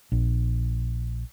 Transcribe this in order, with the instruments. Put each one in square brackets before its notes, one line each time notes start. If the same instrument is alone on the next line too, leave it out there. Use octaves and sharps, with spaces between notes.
[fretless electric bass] A#1